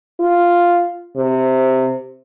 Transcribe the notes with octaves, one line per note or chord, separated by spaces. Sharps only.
F4
C3